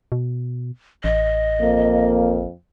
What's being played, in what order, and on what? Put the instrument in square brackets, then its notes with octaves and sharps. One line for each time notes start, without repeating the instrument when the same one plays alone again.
[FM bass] B2
[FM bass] A1 [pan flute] D#5
[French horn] F2 [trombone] A#3